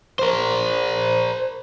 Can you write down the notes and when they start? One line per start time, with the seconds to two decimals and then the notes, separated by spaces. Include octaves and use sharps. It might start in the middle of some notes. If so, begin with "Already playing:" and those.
0.19 A#4 C5